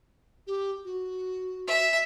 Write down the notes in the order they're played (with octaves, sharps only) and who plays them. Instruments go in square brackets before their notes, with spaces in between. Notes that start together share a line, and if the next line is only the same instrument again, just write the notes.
[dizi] G4
F#4
[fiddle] E5